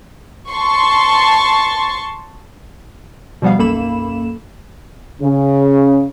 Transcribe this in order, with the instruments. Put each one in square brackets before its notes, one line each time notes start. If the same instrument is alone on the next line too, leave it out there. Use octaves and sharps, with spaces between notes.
[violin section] A5 C6 C#6
[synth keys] B2 F3 G3 B3 F5
B1 F#2 A#3 A4 B5 E7
[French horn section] C#3